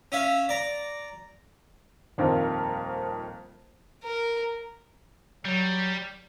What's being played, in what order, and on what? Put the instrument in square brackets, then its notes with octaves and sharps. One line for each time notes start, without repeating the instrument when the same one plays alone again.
[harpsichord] C#4 E5 F5
D5 A#5
[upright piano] D#1 F2 D#3 C4 F4 A#4
[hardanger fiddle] A#4
[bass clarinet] F#3 [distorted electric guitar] G3